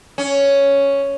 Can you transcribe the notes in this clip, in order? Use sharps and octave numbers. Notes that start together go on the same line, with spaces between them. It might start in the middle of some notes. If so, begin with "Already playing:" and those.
C#4